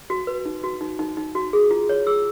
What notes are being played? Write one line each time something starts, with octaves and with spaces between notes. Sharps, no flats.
F#4
B4
D#4
F#4
D#4
D#4
D#4
F#4
G#4
F4
C#5
G#4 E6